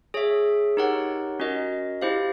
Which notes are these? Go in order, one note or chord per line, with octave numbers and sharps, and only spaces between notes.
G#4 C#5 E5
D#4 G4 A#4 C#5 F#5
C#4 F#4 A#4 D#5
E4 G4 C5 F5